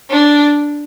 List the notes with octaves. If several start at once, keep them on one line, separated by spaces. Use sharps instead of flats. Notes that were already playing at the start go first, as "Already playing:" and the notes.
D4